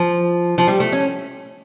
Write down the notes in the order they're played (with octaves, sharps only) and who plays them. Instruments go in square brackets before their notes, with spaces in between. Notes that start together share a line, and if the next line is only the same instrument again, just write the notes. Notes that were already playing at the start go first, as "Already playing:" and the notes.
Already playing: [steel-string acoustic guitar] F3
F3
G3
A3
C#4